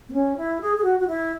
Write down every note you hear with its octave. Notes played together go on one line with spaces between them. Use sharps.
B3
C#4
E4
G#4
G#4
F#4
F#4
E4